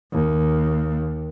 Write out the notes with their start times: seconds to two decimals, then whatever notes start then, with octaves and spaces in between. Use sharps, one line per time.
0.13 D#2